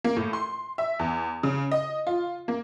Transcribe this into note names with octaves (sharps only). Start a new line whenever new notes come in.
A#3
A2
C6
E5
E2
C#3
D#5
F4
A#3